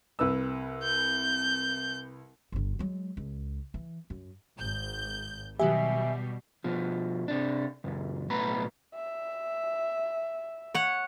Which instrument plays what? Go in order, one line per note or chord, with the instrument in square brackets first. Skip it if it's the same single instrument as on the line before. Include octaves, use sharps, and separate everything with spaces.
[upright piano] C2 B4 E6
[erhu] G6
[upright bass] G1 D3
F#3 G#3
C#2
E3
F#2
[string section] G#1 G6
[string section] B2 G3 [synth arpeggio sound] D#3 F#3 G4 [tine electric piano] E5 G#5
[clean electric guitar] B2 F3
C3 D4
C#2 F#2
B1 A2 B3 A#5 B5
[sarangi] E5
[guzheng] C#5 F#5